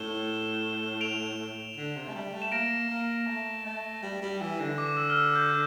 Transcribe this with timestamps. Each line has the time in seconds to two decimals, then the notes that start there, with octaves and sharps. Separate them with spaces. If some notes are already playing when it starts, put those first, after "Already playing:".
Already playing: A2 E7 G7
1.01 D7 F7
1.77 D3
1.96 C3
2.09 A3
2.15 G3
2.33 A3
2.42 E7
2.52 A#3 A#6 D7
2.90 A#3
3.27 A3
3.66 A3
4.03 G3
4.22 G3
4.41 E3
4.60 D3
4.78 D6
4.97 E6
5.10 F6
5.17 E6
5.35 G6